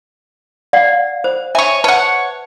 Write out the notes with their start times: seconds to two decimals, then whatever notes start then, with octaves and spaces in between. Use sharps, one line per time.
0.73 D5 F5 F#5
1.24 C5
1.55 C#5 E5 G#5
1.84 B4 C#5 F#5 A5